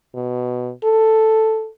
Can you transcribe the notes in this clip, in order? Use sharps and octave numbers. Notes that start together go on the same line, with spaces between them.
B2
A4